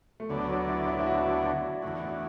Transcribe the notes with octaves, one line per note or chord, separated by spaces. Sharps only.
A3
D2 D3 F#3 B3 D4 A4
F#3
E4
E4
E4
F#4
E4
F#4
E2 D3 A3 E4 F#4
E4
D4